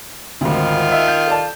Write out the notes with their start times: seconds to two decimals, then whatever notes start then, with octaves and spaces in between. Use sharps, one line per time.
0.41 G#1 D2 D#3 F4
0.92 E5
1.08 G6
1.27 A4 D5 A5